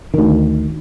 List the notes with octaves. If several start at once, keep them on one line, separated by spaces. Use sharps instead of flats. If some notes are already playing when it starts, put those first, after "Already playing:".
D2 D#3